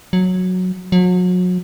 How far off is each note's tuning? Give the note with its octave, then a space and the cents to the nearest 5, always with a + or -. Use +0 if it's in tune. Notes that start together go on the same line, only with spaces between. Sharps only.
F#3 -10
F#3 -35